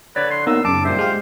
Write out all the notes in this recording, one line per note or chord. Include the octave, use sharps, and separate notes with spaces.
D3 B4 C#5 D5
C6
A#3 B3 D#4 E6
F#2 C#3 A5 D6
G2 A#2 C5 E5
G#3 F4 G4 F5